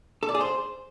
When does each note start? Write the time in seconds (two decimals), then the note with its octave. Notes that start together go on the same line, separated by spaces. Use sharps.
0.23 A4
0.29 D5
0.35 G#4
0.41 C5